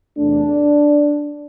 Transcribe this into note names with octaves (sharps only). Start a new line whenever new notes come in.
E2 C3 A3 D4